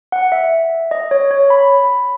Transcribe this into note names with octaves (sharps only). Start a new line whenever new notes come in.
F#5
E5
D#5
C#5
C#5
B5